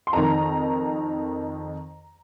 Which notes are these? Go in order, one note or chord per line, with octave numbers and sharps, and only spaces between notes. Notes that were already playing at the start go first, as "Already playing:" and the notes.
C6
F2 D#3 A#5